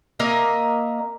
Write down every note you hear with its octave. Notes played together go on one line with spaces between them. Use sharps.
A#3 A#4 D#5 E5